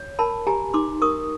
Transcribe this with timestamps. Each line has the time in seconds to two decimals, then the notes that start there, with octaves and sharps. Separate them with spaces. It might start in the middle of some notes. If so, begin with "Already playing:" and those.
Already playing: C#5
0.19 A#4 A5 B5
0.47 G4 G#5 A#5
0.74 D#4 C6 D6
1.02 A#4 C#6 D#6